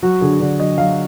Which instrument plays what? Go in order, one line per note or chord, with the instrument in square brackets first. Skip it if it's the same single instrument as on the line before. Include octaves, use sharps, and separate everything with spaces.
[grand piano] F#3 F#4
D3 G#4
D3 D5
F#3 D#5
F#3 F5